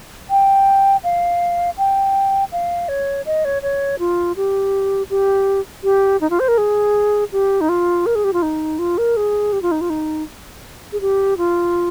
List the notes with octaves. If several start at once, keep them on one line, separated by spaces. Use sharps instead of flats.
G5
F5
G5
F5
C#5
D#5
C#5
C#5
F4
G4
G4
G4
D#4
F4
C5
A#4
G#4
G4
D#4
F4
A#4
G#4
G4
F4
D#4
F4
A#4
G#4
G4
F4
D#4
F4
D#4
G#4
G4
F4